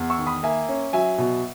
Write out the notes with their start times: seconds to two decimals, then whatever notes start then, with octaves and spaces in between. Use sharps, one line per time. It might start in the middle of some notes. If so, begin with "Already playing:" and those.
Already playing: E2
0.10 C#6 E6
0.18 D#3
0.27 B5 D#6
0.43 A#3 E5 G#5
0.69 C#4
0.93 F#3 E5 G#5
1.18 B2